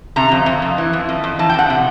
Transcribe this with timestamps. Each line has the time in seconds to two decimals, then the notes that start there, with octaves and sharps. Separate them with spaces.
0.16 C3 A#5
0.32 F2
0.46 F2
0.62 F2
0.78 E3
0.93 F2
1.09 F2
1.24 F2
1.39 E3 A5
1.49 G5
1.54 F2 F#5
1.70 C3